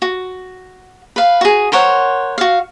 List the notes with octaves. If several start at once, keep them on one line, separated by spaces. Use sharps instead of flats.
F#4
B4 F5
F#4 G#4
A#4 C5 C#5 F#5
F#4 F5